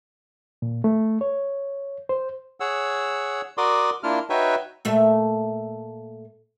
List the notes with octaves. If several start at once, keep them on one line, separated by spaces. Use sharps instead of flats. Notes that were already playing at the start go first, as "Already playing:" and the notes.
A#2
A3
C#5
C5
G#4 C#5 F#5 E6
F#4 A#4 D5 C6 D6 D#6
A#3 D4 E4 F4 F6
D#4 F#4 B4 C#5 E5 G5
A#2 A3 E5